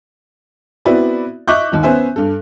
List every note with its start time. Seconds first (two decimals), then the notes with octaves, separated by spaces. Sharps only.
0.85 B3 C4 E4 F#4 B4 D5
1.48 D#5 E5 C#6 D6 F#6 G6
1.72 D#2 D#3 D#4
1.83 B3 C#4 C5 E5 G#5
2.16 G2 A4